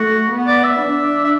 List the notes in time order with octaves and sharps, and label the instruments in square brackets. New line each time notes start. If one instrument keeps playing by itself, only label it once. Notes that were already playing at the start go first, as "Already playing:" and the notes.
Already playing: [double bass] A3 [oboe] F#4
[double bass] B3
[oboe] D5
E5
[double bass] D4
[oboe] E5